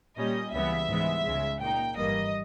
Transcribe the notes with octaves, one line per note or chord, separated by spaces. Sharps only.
A#2 G3 C#4 D#5
C#2 C#3 E3 G3 B3 E5
G#2 E3 G#3 B3
C#2 C#3 G#3
A#2 A#3 D#4 G5
G#1 G2 E3 G3 A#3 D#5